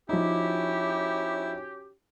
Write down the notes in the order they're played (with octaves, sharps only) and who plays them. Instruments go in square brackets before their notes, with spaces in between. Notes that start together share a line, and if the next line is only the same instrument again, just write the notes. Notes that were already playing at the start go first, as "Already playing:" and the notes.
[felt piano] F3 D#4 [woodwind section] C#4 F#4 G4 [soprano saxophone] E4